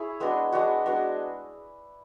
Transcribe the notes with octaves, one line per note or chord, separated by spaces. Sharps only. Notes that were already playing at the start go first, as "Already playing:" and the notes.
Already playing: E4 G#4 C#5
G#3 B3 D4 F#4
G#3 B3 D4 F#4
G#3 B3 D4 F#4